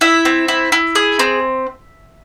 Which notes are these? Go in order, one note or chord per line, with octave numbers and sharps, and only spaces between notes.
E4 E5
C4
E4
E4
G#4
C4